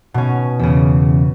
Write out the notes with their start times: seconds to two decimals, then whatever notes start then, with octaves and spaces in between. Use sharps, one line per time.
0.14 B2 C#4
0.59 E2 C#3